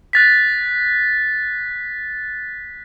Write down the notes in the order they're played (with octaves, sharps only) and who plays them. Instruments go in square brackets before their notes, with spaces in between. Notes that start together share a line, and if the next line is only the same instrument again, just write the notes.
[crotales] F#6 A6 B6